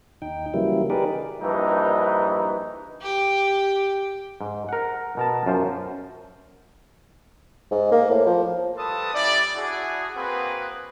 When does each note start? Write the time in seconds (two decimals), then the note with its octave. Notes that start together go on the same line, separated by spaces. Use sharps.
0.22 D#2 D#4 G5
0.54 C#3 E3 F#3 G3 A#3 E4
0.90 D#4 G4 G#4 A#4 B4 D5
1.41 A#1 G2 E3 D#4
3.02 G4
4.41 G#2
4.69 A#4 F#5
5.17 B2 A#4 A5
5.46 F#2 F4 C5
7.71 G#2
7.92 A#3
8.10 A2
8.26 F3
8.77 G3 F4 A4 B4 A5 D#6
9.13 G3 C#4 E4 D5
9.55 D4 E4 F#4 G#4
10.15 A#3 C4 F#4 G#4 B4